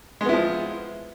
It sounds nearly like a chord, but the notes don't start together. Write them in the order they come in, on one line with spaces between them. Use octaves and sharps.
G#3 B3 E4 F3